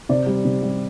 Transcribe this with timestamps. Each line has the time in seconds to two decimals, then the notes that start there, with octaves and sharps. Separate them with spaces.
0.09 C3 D5
0.26 G3
0.45 C3
0.62 G3